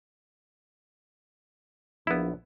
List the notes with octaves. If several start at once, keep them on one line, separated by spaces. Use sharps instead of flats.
A#1 B3 E4